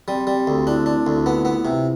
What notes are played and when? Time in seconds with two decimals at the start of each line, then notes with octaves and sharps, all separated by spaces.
0.08 G3 C4
0.27 G3
0.47 D2
0.67 D4 E4
0.86 D4
1.07 D2
1.17 F4
1.26 B3 E4
1.45 B3
1.65 C3